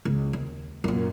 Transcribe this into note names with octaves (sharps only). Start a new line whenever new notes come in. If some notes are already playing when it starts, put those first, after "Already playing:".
C#2
D#2
F#2 A#2